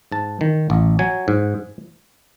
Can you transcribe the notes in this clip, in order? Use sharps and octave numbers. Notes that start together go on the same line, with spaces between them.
G#2 A5
D#3
A1
F#3 G#5
G#2